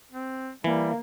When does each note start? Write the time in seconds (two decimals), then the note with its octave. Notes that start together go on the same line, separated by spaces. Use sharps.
0.12 C4
0.64 E3 G3 A#3